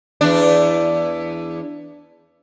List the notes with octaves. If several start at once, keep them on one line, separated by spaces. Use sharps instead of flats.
E2 D4